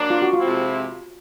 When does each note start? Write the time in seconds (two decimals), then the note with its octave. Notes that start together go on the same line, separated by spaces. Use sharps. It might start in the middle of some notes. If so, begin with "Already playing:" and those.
Already playing: F#3 A#3 D4
0.10 F4
0.22 F#4
0.33 F4
0.40 C3 F3 G#3 C4 E4